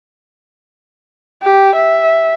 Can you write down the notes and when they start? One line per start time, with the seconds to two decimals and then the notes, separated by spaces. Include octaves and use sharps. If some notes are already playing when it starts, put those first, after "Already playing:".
1.43 G4
1.75 E5